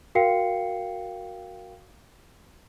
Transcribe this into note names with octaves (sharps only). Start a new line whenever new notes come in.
F#4 A#4 F5 G5 C7 C#7